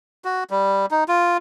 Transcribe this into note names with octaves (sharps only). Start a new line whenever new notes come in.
F#4
G3
D#4
F4